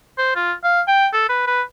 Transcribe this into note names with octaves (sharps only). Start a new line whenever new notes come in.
C5
F4
F5
G5
A4
B4
B4